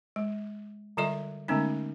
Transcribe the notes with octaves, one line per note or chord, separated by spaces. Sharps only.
G#3
D3 G3 F4 A4 D#5 E5
D3 G#3 A3 B3 C#4 D#4